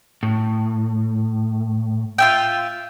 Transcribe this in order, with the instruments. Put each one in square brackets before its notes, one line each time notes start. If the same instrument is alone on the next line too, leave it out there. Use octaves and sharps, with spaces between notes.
[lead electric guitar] A2
[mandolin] F4 E5 G5